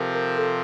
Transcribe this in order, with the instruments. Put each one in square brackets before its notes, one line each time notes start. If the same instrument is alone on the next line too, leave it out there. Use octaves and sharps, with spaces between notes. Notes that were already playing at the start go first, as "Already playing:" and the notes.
Already playing: [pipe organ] C3 F3 C4 [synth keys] G4 A4 A#4
[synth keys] A#4
A4